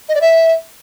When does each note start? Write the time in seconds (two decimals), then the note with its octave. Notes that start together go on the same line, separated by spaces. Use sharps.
0.09 D#5
0.15 D5
0.21 E5